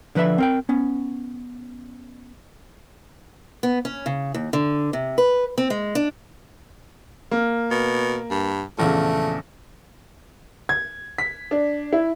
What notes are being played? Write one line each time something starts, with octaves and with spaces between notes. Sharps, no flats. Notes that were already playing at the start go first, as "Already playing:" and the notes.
D3 F3 B4 C5 E5 B5
C4 A#4 G5
B3 C#4
B3
C#4
C#3
D#2
D3
C3
B4
C4
G#3
D4
A#3
B2
G2
A#1 E2 C#3 A3
G#6
B6
D4
E4